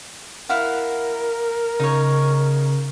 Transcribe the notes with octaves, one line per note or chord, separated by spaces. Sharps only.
E4 A#4 F5 F#5
C#3 D#4 C#5